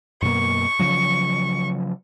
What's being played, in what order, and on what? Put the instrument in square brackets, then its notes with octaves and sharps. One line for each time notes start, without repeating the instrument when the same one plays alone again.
[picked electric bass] F#2 B2 A#3 [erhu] C#6
[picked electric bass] C#3 F3 F#3